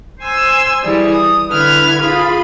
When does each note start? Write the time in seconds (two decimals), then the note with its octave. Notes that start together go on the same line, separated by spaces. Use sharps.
0.21 C5 G#5 C6 E6
0.83 E3 G3 G#4
1.13 D#6
1.49 D3 E4 B4 F6 G#6
2.00 F4 G#4 B5